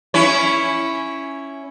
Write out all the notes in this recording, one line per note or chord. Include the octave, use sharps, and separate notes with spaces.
C#4 E4 C#5